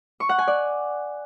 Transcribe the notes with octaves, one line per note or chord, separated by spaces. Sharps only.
C#6
F#5
G#5
D5